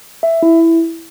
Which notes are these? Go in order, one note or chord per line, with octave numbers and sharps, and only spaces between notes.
E5
E4